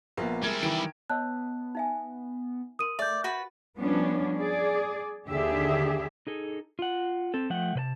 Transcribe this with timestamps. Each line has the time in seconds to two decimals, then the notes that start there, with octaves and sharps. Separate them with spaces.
0.17 A#1 A#3 B3
0.43 G3 G#3 E4 A#4 G#6
0.63 D#3 E3 G5 D7
1.10 B3 C#5 D#5 A5 E6 F#6
1.75 D#4 E5 G#5
2.79 A#4 C6 D#6 D#7
2.99 A3 D5 E5 G6
3.24 F#4 B4 A6
3.78 F3 G3 B3 C#4 D4
4.37 G#4 D5
5.30 D#2 D3 G4 G#4 E5
6.27 D#4 G#4 A4
6.79 F4 F#5
7.34 C4 A4
7.50 F3 A3 F#5 G5
7.75 C3 B4 A5